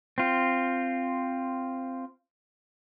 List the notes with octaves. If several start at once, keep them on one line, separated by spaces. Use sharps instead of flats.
C4 F4